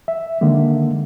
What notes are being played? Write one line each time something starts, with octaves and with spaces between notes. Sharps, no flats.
E5
D3 D#3 G#3 A#3